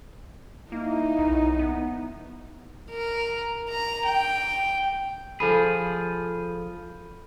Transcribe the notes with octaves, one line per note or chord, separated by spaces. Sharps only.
A#3 D#4 E4
B1
B3
A#4
A#5
G5
F3 G#4 A4 B5